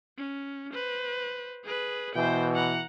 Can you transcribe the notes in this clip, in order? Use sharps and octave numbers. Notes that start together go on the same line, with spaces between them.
C#4
B4 C5
G#4 B4
B2 E3 C5 G5
F#5 A#5